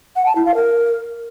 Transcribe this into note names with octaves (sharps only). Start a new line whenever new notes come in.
F#5
A5
E4
F5
A#4